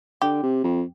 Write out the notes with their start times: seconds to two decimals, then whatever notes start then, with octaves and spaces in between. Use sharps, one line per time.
0.22 D3 G4
0.43 C3
0.64 F2